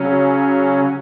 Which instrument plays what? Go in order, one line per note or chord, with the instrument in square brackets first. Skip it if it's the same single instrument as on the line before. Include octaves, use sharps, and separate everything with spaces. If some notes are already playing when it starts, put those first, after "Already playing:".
Already playing: [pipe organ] C#3 F#3 C#4